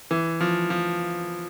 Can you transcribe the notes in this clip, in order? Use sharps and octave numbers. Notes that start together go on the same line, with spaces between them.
E3
F3
F3